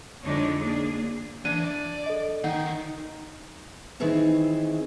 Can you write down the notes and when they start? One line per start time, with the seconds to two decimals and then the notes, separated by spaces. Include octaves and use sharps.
0.23 F2 D3 G#3 D4 D#4 C#5
0.61 A#3 D4 G#4
1.45 E3 D4 D#7
1.64 D5
2.06 A4 D#5
2.44 D#3 D#4 F#5
4.00 D#3 E3 C4 G#4 E5